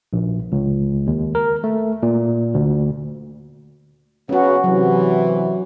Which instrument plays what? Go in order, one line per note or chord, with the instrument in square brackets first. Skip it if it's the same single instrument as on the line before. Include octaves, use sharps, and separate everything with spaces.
[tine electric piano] A#1
C#2
D#2
A#4
A3
A#2
D2
[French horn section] C#3 F#3 B3 [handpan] C#4 F#4
[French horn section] C3 E3 [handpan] F#3